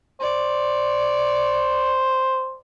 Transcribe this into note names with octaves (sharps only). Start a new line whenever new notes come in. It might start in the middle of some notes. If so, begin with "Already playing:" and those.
C5 D5